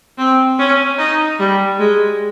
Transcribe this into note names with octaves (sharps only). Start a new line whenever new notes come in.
C4
C#4
D#4
G3
G#3